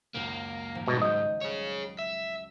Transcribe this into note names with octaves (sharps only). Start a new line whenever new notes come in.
C#2 F#2 C#3 A#3
G#1 F3
G#2 B2 G3
F#3 D#5 D#6 G6
G#4 C#5
E5